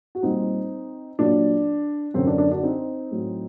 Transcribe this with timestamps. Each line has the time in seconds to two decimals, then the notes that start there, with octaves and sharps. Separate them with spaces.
0.15 F#4
0.23 A#2 G3 C4 D#4
1.19 A#2 F#3 D4
2.14 F#2 D3 F#3 C4
2.27 D4
2.38 D4
2.51 D4 F#4
2.63 C4 D#4
3.11 A2 F#3